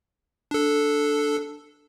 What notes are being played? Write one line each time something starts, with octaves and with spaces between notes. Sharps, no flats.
D4 A4